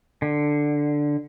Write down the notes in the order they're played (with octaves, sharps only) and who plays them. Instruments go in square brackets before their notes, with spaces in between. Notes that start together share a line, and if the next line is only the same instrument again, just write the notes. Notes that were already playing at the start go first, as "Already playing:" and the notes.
[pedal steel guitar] D3